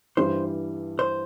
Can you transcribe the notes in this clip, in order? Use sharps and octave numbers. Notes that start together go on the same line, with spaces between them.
G2 E3 G3 C5
C5